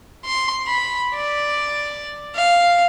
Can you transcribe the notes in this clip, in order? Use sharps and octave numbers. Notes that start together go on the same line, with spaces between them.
C6
B5
D5
F5